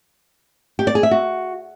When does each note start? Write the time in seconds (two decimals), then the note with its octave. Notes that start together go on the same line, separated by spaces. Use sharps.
0.79 G4
0.87 D5
0.95 G#4
1.03 E5
1.11 F#4